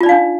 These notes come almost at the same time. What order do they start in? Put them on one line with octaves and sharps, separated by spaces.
F4 D5 D#4 F5 D4